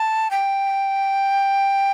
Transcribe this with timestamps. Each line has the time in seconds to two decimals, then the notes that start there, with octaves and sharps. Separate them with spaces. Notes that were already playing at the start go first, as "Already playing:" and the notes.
Already playing: A5
0.31 G5